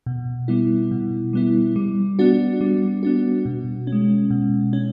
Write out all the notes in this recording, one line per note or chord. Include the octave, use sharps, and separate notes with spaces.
B2
G3 B3 E4
B2
G3 B3 E4
G3
B3 D4 F#4
G3
B3 D4 F#4
B2
C#4
G#3
B2
C#4